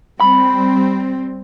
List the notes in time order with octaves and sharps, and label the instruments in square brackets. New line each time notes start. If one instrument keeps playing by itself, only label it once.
[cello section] G3 C4 [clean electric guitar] B5